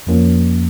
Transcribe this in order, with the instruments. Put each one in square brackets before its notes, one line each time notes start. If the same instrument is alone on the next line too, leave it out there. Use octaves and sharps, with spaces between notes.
[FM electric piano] F2 F3 A#3 C#4